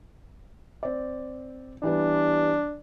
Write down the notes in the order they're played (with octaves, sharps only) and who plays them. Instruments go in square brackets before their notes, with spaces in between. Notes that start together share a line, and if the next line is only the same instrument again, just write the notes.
[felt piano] C4 D5
[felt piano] E3 G3 B3 [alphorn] D4